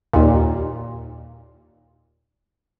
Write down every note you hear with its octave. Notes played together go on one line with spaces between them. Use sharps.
D#2 A#2